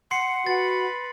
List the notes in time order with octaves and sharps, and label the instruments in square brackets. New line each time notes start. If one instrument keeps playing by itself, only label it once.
[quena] F#5 [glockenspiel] C6 C7 C#7
[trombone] F#4 [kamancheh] B4 B5 [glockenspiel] A6